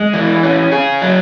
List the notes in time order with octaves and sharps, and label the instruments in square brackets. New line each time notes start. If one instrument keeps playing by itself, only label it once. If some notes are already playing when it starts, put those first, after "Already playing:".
Already playing: [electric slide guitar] G#3
E3
C#4
G#4
F#3